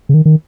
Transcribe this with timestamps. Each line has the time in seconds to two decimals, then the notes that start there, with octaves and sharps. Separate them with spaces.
0.09 C#3
0.14 D#3
0.25 D#3